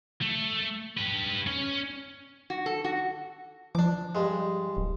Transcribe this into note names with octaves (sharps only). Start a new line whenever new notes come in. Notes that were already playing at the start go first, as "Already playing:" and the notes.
A3
G4 B4
C#4
F#4
A4
F#4
F3 D4 D6
G2 G#3
D1